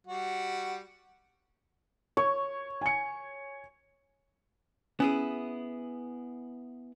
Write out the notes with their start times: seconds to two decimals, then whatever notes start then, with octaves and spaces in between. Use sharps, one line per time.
0.07 G3 F#4
2.17 C#5 C#6
2.81 G#5 C#7
5.00 B3 C#4 E4 G#4